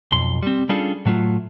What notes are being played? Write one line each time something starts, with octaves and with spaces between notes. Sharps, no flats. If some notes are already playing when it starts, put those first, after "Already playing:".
B1 F2 C6
G3 C4
G3 C#4 D4 F4 G#4 A4
A2 F#3 A3 F4